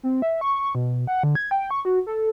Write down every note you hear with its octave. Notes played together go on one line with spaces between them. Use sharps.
C4
E5
C#6
B2
F#5
D3
G#6
G5
C#6
F#4
A4